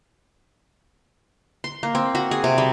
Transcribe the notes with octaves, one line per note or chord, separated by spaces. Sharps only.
C6
A#3
C4
F#4
G#4
C3
G3